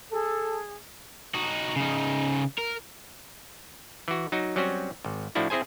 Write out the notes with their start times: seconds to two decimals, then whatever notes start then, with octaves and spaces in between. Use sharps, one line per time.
0.13 G#4 A4
1.35 D#4 F#4
1.76 C#3 D#4
2.58 A#4
4.08 E3 F#4
4.32 F#3 D#4 F#4
4.56 F#3 G3 C4 C#4 F#4
5.05 G#1
5.35 A2 F3 D4 E4 F#4
5.50 C4 E4 G#4 C5 G#5